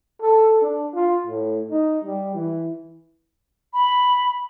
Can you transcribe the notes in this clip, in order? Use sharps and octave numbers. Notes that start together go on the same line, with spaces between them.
A4
D4
F4
A2
D#4
G3
E3
B5